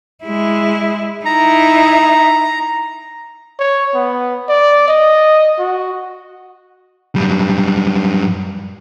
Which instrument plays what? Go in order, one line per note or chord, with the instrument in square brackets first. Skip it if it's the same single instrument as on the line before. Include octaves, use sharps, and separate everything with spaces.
[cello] G#3 E4
[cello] D#4 E4 [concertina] A#5
[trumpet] C#5
B3
D5
D#5
F#4
[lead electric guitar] F#2 G3